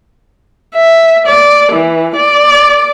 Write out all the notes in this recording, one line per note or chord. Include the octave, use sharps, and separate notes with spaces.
E5
D5
E3
D5